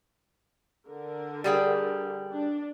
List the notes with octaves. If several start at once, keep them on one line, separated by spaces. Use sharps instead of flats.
D3 A#4
G3 G#4 G5
D4